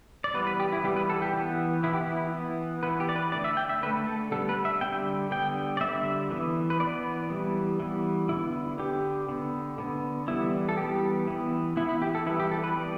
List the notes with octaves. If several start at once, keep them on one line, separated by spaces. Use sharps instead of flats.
D5
E3 G3 B3 B4
B4
G4
E4
E3 G3 B3 G4
B4
A4
G4
E3 B3
E3 B3 E4
G4
E4
E3 B3
E3 B3 B4
G4
D5
B4
D3 A3 D5
E5
G5
E5
D3 A3 B4
A4
D3 G3 B3 A4
B4
E5
D3 G3 B3 G5
D3 G3 B3 G5
D5
D3 G3 B3 E5
E3 B3
B4
E3 B3 D5
E3 G3 B3
E3 G3 B3
D3 B3 E4
D3 B3 G4
D3 B3
D3 B3
E3 G3 B3 E4
A4
E3 G3 B3 G4
E3 B3
E3 B3 E4
E4
G4
A4
E3 G3 B3 E4
G4
A4
B4
E3 G3 B3 D5